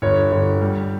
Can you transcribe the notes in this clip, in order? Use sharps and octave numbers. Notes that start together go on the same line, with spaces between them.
G1 C#5
G1
G3